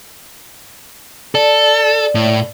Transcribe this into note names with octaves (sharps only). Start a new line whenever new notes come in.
A4 D5
A2